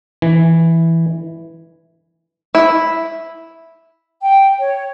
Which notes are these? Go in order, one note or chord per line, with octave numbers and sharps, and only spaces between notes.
E3
E4
G5
C#5